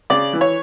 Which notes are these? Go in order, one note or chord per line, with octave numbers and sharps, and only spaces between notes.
C#3 D5
E3
C#5